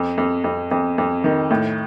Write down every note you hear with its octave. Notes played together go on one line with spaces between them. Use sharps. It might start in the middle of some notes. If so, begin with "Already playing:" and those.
Already playing: F2
F2
F2
F2
F2
D#3
A2